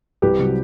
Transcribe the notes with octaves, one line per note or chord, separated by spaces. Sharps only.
C2 G4 B4
C3 F#3